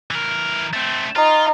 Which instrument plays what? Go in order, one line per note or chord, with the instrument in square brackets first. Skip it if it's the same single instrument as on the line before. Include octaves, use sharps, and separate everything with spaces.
[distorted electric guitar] E3 A#4
A3 C4
[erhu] D#4 [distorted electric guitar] F4